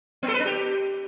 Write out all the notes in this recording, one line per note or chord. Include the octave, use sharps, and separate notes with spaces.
B3
A4
B4
D4
G4